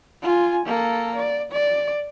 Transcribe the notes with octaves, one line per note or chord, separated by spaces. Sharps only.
F4 G#5
A#3 A4
D5
D5